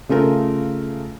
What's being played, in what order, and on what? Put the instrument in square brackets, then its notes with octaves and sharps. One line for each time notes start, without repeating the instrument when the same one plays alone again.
[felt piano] C#3 A3 F4 A#4